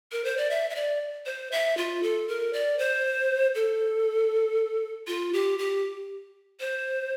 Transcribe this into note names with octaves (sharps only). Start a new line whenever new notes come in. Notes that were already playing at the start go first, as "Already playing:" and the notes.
A#4
C5
D5
E5
E5
D5
C5
E5
F4
A4
A#4
D5
C5
A4
F4
G4
G4
C5